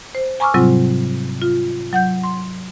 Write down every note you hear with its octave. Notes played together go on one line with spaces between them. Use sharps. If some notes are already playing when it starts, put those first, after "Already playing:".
C5
G#5 A#5 C#6 D6 E6 F6
G#2 C3 F#3 G3 C4 F4
F4
F#3 F#5 G6
C6